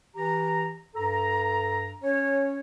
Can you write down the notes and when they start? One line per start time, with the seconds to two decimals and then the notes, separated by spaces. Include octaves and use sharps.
0.16 E3 G4 A#5
0.95 G2 A4 A#5
2.01 C#4 C#5